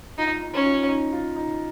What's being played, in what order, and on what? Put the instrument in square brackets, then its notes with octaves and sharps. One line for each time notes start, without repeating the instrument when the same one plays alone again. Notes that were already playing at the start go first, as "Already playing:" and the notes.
[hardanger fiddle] D#4 [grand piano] F4
[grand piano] D#4
[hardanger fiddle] C#4
[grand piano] F4
D#4
F4
D#4